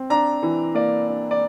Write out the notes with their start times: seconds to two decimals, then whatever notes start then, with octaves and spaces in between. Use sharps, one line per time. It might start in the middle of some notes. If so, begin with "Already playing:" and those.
Already playing: C4
0.10 D4 A#5
0.42 E3
0.75 A#3 D5
1.07 D4
1.31 D5